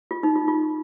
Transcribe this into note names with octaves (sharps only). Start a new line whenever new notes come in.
F4
D#4
F4
F4